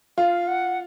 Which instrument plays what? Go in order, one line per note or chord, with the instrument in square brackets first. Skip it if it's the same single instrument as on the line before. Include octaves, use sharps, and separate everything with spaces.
[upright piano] F4 [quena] F5
[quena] F#5